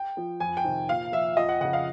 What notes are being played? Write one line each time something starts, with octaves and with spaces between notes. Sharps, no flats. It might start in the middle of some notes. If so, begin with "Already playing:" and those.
Already playing: G5
F3
F2 G#5
G5
C3 D#3
A#2 F5
F3 E5
F2 D#5
F#5
C#3 F3 F#5
F5